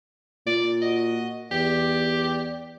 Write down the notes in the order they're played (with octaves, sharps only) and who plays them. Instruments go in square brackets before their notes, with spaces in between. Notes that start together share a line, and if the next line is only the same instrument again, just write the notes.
[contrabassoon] A#2 [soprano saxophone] D5
[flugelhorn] F#4 [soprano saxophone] D#5
[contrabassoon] E2 [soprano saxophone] G4 [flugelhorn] D5